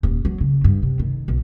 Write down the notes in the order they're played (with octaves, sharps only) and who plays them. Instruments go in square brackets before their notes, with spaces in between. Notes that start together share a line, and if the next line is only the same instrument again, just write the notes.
[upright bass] D#1
F#3
C#3
G2
C3
D#3
B1